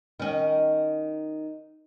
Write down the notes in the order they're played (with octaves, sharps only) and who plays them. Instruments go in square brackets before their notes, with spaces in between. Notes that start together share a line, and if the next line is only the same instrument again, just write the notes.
[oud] D#3 C#4